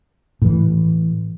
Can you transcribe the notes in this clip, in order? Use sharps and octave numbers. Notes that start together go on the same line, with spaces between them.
A2 E3